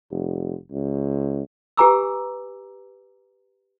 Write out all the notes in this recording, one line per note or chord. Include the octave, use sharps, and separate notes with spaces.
F1
C#2
G4 B4 G#5 A#5 D6 E6